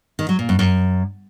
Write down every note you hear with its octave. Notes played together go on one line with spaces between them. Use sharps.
D#3
F#3
A#2
F#2
F#2